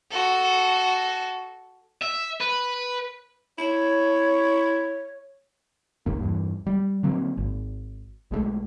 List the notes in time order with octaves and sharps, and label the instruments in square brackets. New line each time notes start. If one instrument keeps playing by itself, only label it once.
[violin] F#4 A4
[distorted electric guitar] E5
B4
[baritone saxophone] E4 [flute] C#5
[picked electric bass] F#1 D#2 A#3
E2 G2
G3
D3 F#3 A#3 C4
G#1
B1 G#3 A3